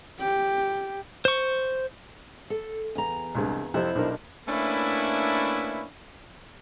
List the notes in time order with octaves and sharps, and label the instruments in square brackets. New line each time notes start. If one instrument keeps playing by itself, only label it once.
[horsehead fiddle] G4
[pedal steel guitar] C5 C#6
[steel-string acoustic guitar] A4
E2 A#5
[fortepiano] C2 G2 G#3
[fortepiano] F2 C3 [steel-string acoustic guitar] E4 C5
[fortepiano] B1 D4 A#4
[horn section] A3 A#3 C#4 D4 E4 B4